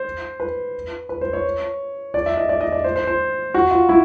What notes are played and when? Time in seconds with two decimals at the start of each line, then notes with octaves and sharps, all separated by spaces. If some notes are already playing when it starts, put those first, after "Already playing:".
Already playing: C5
0.40 B4
1.09 B4
1.21 C5
1.33 C#5
2.14 D5
2.26 E5
2.37 D#5
2.49 D5
2.61 D#5
2.72 D5
2.84 C5
2.96 C5
3.07 C5
3.54 F#4
3.71 F4
3.89 E4